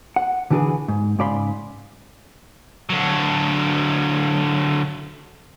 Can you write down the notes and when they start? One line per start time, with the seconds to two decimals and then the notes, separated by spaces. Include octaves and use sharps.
0.16 F#5
0.50 D3 E3 D4 F#4 G#4 B4
0.88 G#2
1.19 G#2 C#3 D5 F5 B5 C6
2.90 D3 F#3